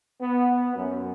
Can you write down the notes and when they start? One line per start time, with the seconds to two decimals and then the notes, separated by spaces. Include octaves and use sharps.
0.21 B3
0.76 F#2